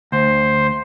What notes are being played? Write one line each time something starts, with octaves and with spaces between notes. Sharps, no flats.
D2 C5